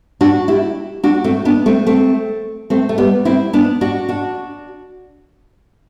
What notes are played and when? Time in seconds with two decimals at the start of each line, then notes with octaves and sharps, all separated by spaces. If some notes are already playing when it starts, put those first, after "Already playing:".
0.21 D4 F#4
0.48 E4 G4
1.04 D4 F#4
1.24 A3 C4
1.45 B3 D4
1.66 A3 C4
1.87 A3 C4
2.70 A3 C4
2.89 A3
2.98 G3 B3
3.25 C4 E4
3.53 B3 D4
3.81 D4 F#4
4.09 D4 F#4